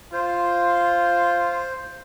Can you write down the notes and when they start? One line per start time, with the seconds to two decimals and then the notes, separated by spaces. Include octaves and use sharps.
0.13 F4 C5